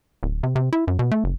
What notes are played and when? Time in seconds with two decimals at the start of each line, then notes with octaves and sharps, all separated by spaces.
0.23 D1
0.43 C3
0.56 C3
0.73 E4
0.87 F#2
0.99 B2
1.11 A3
1.24 F#1